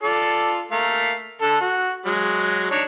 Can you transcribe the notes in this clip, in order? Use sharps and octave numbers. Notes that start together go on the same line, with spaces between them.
F4 A4 D5
A3 A#4 F5
D3 A4
F#4
F#3 G#3
D4 D#4 C#5